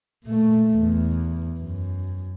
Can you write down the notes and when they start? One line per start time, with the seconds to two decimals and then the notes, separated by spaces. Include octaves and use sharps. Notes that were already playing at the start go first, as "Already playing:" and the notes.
0.24 A#2 A3
0.78 E2
1.59 F#2